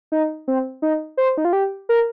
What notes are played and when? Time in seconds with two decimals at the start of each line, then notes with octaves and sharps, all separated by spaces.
0.12 D#4
0.48 C4
0.82 D#4
1.17 C5
1.37 D#4
1.45 F4
1.53 G4
1.89 A#4